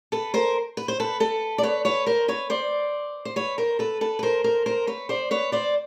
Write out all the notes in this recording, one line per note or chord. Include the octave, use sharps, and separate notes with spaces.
A4 B4
A#4 C5
B4
C5
A4 B4
A4 B4
D5
B4 C#5
B4 C#5
A#4 C5
B4 C#5
C5 D5
C5
B4 C#5
A#4 C5
A4 B4
A4 B4
B4
A#4 C5
A#4 C5
A#4 C5
B4 C#5
C5 D5
B4 C#5
C5 D5